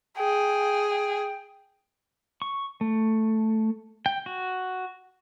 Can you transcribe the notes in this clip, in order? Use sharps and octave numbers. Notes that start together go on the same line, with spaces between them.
G#4 G5
G5
C#6
A3
G5
F#4